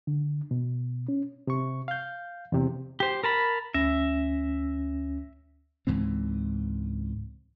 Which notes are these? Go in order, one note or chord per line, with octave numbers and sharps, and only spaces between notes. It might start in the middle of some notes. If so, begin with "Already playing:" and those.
D3
B2
C#4
C3 C#6
F5 G6
E2 C3
G4 C5
A#4 A5 B5
D2 C#4 E5 A#6
C#2 G#2 E3 C4